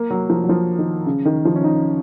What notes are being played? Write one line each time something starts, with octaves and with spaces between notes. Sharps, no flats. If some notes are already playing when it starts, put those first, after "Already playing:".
Already playing: A#3
F#3
F3
F#3
F3
D#3
C#3
D#3
F3
C#4
D#4